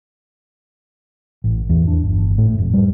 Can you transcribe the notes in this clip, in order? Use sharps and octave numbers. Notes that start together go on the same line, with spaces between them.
A1
E2
D4
G1
A2
F1
G3